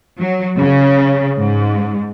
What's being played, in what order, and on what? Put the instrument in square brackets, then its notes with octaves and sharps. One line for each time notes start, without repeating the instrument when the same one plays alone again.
[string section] F#3
C#3
G#2